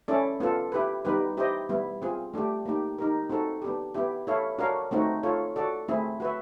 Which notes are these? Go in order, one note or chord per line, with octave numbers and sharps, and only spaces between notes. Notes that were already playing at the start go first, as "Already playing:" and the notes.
C#4 E4 A4 D5
B3 D4 F4 A4
E4 G4 B4
G3 B3 D#4 G4 B4
E4 G4 C5 D#5
G3 B3 E4
C4 F4 G#4
A3 D4 G4
A#3 D#4 G4
D#4 G4 A#4
C4 D#4 F#4 A4
B3 D4 G4
B3 E4 G4
E4 A4 C#5 F5
D4 F#4 A#4 C#5 F5
A3 C4 D#4 F#4
F4 A4 C#5
F#4 A4 D5
A3 C4 E4 G#4
F#4 B4 E5